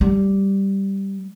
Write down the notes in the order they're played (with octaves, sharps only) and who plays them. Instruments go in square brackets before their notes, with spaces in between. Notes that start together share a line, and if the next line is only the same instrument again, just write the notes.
[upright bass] G3